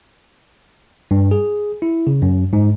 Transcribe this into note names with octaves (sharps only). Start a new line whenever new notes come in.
G2
G#4
E4
C#3
F#2
G#2